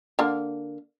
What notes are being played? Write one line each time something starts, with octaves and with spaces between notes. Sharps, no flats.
D3 A#3